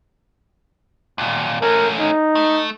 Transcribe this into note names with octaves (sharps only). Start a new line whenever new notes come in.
D#2 A#2
A3 C#4 A#4
D#4
A3